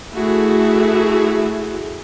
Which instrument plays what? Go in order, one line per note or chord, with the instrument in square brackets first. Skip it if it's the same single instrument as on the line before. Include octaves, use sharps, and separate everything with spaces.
[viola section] A3 E4 F#4 G#4